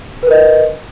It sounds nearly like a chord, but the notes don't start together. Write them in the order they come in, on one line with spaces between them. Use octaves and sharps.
B4 A#4 D#5